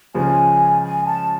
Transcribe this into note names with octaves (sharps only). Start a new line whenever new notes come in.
C#2 C#3 F3 G#3 G#5
G#5
A5